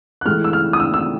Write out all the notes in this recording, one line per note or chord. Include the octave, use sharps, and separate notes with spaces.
F#6
A2 E3 G#3 F6
E6
F6
D#6
E6
E6